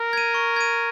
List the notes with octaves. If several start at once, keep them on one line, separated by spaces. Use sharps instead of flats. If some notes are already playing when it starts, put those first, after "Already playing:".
Already playing: A#4
G#6 D#7
C#6
G#6 D#7